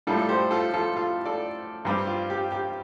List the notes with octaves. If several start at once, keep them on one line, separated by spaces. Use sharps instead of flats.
A2 G3 D4 F4 A4
A4
G4 C5
F4 A4
F4 A4
F4 A4
A4 D5
G2 G3 C4 G4
F4
G4
G4